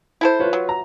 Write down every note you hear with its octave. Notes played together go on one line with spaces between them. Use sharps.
E4 A4 C5
F4 B4 C#5
F#3
A#5